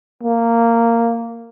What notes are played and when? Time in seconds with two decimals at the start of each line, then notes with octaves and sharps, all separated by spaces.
0.23 A#3